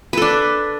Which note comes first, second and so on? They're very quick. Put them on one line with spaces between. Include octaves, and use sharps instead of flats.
B4 A4 D4